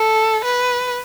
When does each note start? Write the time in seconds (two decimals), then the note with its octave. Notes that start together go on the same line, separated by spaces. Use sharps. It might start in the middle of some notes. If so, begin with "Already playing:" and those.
Already playing: A4
0.44 B4